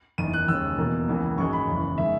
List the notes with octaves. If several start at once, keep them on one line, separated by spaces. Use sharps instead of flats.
F#1 E2 D#3 D#7
F#6
D#2 C#3 G#3 E6
E2 B2 A#3
C#2 C#3 E3 A#3
G#1 F#2 D#3 G#3 C#6
B5
F#1 E2 C#3
D#3 G#3 E5